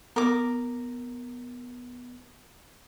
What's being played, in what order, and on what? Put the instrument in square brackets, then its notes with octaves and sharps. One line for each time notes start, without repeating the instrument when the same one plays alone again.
[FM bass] B3 [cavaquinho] A#4 D6